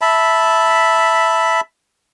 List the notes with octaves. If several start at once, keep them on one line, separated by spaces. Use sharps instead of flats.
E5 A5 B5